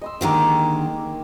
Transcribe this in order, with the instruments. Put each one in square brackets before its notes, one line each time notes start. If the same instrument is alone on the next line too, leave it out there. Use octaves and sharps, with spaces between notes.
[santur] D#5 C6 E6
[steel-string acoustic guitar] D3 D#3 G#3 [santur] A#3 G4